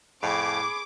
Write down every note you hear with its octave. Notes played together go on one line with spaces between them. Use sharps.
F2 A2 G#4 B5 C#6 D6